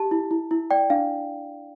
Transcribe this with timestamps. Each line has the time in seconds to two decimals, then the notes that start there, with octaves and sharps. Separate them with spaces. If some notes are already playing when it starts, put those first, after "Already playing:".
Already playing: G4 A5
0.11 E4
0.31 E4
0.51 E4
0.71 D5 G5
0.90 D4 F5